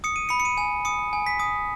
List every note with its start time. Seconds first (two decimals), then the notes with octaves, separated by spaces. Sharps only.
0.04 D#6 C#7
0.16 D#7
0.29 B5 C#7
0.40 C#7
0.45 D#7
0.58 G#5
0.85 D#6 C#7
1.13 G#5
1.26 B6
1.40 D#6